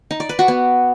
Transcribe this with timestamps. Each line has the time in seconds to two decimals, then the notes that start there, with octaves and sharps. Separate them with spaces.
0.11 D#4
0.20 D5
0.29 B4
0.39 F#4
0.48 B3